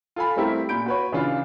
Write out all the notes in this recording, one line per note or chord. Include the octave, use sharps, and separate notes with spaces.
F4 A4 G#5 B5
G3 A3 C4 E4 G4 A#4
A#2 B5 G6 D7
F#4 B4 C#5
C#3 E3 D4 F4